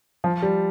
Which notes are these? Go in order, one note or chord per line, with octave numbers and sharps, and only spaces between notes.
F3
G3